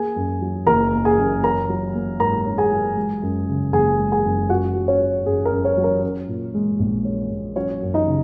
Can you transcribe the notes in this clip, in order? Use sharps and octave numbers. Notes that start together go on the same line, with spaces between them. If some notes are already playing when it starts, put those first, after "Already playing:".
Already playing: A#3 G#4 G#5
F#2
F#3
F#1 A#4 A#5
A#3
G#4 G#5
F#2
C#4 A#4 A#5
F#3
A#3
G#2 A#4 A#5
C#4
G#4 G#5
F#3
G#3
F#2
C#3
F#1 G#4 G#5
G#3
G#4 G#5
F#2
F#2 F#4 F#5
F#3
C#4 C#5
C#4
F#2 G#4
A#4
F#2
C#4 C#5
F#3
A#4
C#4
A#2
G#3
A#1
C#4
A#2
F#3 C#4 C#5
F#2
D#4 D#5
C#3